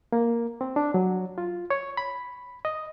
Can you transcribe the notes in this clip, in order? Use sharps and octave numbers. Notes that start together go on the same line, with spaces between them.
A#3
C4
D4
F#3
F4
C#5
B5
D#5